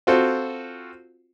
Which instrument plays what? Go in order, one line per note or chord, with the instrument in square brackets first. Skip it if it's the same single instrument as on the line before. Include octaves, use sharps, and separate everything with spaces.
[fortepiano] C4 F4 F#4 A4 C5